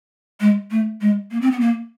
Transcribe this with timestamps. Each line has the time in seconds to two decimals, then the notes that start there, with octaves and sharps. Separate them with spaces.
0.40 G#3
0.71 A3
1.01 G#3
1.31 A#3
1.41 C4
1.51 B3
1.60 A#3